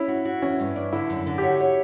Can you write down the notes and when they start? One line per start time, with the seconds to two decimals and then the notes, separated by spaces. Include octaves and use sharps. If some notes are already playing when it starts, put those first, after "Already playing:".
Already playing: C#4 E4
0.08 F#4
0.25 F#4
0.42 E3 C#4
0.59 G2
0.76 D4
0.93 D3 E4
1.10 F#2
1.26 D3
1.38 G4
1.43 F#4 C#5
1.61 C#5